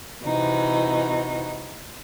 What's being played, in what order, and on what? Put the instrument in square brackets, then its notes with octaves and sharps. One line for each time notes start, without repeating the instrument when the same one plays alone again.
[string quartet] C3 E3 D#4 F#4